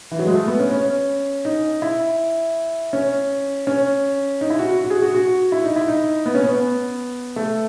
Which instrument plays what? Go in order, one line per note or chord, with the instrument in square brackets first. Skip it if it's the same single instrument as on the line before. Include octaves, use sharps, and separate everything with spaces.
[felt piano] E3
F#3
G#3
A3
B3
C#4
C#4
D#4
E4
C#4
C#4
D#4
E4
F#4
F#4
G#4
F#4
F#4
E4
D#4
E4
D#4
B3
C#4
B3
A3